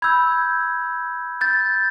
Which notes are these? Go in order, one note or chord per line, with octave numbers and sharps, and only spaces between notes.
B5 E6 G6 G#6
G6 A6